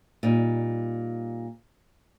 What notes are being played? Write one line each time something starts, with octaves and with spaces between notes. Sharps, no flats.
A#2 G3 D#4